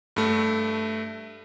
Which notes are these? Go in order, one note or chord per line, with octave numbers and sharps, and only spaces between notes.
G2 A3